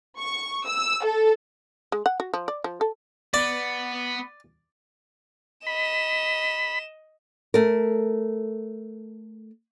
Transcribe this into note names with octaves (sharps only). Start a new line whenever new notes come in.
C#6
E6
A4
G#3
F#5
F#4
F3
D5
F3
A4
B3 D5
D#5 B5 E7
A3 A#4